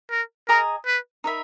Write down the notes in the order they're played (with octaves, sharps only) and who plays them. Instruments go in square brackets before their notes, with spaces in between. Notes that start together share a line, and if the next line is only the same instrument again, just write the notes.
[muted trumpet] A#4
[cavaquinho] G#4 D#5 A#5 D#6 [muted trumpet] A#4
[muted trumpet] B4
[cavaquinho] D#4 A#4 E5 B5